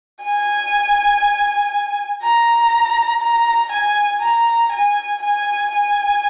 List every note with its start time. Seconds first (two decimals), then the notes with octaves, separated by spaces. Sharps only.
0.22 G#5
2.23 A#5
3.22 A#5
3.72 G#5
4.22 A#5
4.72 G#5
5.22 G#5
5.73 G#5